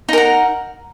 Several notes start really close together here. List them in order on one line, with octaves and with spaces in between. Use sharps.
D#4 A#4 F#5